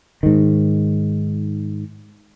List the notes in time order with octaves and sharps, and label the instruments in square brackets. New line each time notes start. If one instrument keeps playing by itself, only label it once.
[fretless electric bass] G#2 D#3